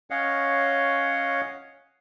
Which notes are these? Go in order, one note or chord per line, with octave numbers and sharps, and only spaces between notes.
C#4 C#5 D#5 F5 F#5